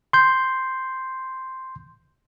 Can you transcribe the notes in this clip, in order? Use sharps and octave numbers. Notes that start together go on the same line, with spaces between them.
C6 G6